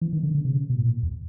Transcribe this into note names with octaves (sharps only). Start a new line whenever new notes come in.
E3
D#3
D3
D3
C3
C#3
B2
A2
A#2
E2